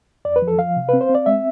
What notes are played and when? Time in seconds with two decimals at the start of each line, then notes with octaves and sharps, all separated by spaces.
0.25 F2 D5
0.36 B4
0.42 F3
0.48 A4
0.58 F3 F5
0.76 C3
0.89 C4 B4
1.01 C5
1.09 C4
1.15 D5
1.26 G#3 E5